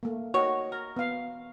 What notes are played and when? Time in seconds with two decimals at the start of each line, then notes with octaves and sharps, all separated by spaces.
0.03 A3 A#3
0.34 D#3 F#4 C#5 D#5
0.72 A#4 A#5
0.96 B3 F5